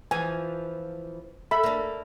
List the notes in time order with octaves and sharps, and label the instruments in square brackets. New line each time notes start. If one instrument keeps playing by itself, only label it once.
[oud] E3 F3 [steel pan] G#5
[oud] A4 [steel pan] E5 B5
[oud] A#3 D4